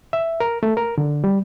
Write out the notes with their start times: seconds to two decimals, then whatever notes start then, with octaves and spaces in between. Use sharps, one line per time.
0.13 E5
0.40 A#4
0.63 A3
0.77 A#4
0.98 D3
1.24 G3